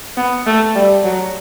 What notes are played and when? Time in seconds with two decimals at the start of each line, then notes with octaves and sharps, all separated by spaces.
0.17 B3
0.47 A3
0.75 G3
1.04 F#3